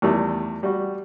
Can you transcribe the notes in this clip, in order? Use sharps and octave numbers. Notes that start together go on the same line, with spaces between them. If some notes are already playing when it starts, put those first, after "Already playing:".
E2 D#3 G3 A3
G3 F#4